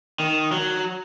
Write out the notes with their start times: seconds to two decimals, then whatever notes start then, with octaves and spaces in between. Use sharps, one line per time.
0.20 D#3
0.52 F#3